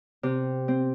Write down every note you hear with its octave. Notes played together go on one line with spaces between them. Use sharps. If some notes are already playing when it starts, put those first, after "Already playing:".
C3
C4